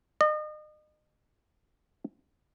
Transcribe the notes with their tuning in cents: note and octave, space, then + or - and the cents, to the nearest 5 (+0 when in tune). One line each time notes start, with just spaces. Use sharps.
D#5 -35